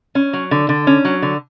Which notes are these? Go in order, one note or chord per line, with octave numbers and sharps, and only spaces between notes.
C#4
F#3
D3
D3
C#4
F#3
D3